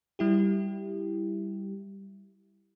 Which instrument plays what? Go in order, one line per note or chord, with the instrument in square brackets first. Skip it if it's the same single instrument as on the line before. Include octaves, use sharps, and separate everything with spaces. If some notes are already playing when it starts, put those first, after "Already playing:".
[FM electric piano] G3 E4 G4